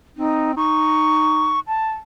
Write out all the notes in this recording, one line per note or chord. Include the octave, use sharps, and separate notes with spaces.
C4 D#4
D#4 C#6
A5